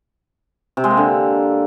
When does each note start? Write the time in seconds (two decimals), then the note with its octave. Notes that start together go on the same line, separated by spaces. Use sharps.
0.77 C3
0.84 G#3
0.91 A#3
0.97 D3